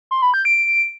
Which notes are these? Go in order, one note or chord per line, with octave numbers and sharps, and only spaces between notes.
C6
B5
G6
D7